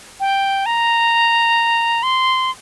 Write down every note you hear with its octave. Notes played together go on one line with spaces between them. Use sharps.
G5
A#5
C6